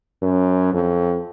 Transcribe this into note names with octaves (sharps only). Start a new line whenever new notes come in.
F#2
F2